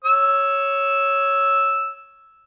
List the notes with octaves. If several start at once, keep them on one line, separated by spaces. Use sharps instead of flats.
C#5 E6